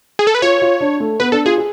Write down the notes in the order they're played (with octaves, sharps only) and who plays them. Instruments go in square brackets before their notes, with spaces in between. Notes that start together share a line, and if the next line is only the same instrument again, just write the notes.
[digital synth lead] G#4
A4
B4
[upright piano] F4 [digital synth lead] C#5
[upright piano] F4
D4
A3
[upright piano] B3 [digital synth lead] B4
[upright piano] D4 [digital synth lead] A4
[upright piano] F4 [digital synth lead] G#4
[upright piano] G#4